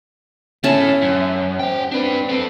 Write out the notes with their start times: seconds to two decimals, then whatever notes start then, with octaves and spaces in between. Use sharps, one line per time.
0.64 A3 C#4 E4 A5
1.02 F#2
1.59 F#4 C5 G5
1.92 C4 D4 B4
2.29 C4 A4